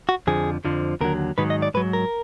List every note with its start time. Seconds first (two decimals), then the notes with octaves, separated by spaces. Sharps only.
0.09 F#4
0.27 F2 D3 F3 G#4
0.65 F2 D3 F3
1.01 D#2 D3 F#3 A#4
1.38 G#2 D#3 F#3 B4
1.50 D#5
1.62 D5
1.74 G#2 F#3 B4
1.93 A#4